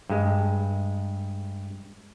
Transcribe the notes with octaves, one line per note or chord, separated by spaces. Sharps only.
G2 G#3